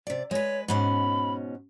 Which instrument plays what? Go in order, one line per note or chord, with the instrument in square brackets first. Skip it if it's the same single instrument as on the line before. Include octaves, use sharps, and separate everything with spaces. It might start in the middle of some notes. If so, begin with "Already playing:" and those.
[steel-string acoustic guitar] C3 D5
[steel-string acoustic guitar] G#3 B4 [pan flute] C#5
[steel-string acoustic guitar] G#2 B2 C#4 [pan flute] B5